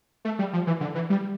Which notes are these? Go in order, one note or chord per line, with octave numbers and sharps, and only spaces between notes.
A3
G3
F3
E3
D3
E3
G3